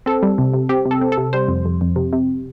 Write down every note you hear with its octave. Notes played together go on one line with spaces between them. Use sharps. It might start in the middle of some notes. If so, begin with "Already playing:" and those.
C4 A4
G3
C3
C3
C4 G4
C3
A4
C4
A4
C3
G3 C5
F2
F2
F2
C3
C3